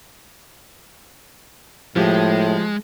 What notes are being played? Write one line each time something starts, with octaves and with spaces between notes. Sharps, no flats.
A2 F3 G#3 G4